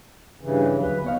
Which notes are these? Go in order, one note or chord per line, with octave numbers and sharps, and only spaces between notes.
G2 C#3 E3
D2 F#3 B4
C#3 F3 B3 D#4 C#5 F5